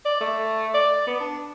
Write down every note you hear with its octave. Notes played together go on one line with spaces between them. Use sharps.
D5
A3
D5
B3
D4